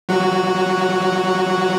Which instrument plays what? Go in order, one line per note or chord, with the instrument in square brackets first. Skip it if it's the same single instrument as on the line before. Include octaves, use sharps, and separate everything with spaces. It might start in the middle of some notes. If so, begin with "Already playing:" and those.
[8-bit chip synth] F#3 F#4